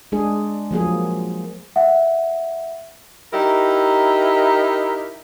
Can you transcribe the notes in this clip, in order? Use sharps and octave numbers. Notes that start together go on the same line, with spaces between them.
G#3 D4 G#4
F3 F#3 A#3 G#4
E5 F#5
D#4 E4 G4 A#4